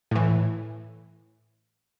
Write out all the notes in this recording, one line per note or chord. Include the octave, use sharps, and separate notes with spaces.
A2 E3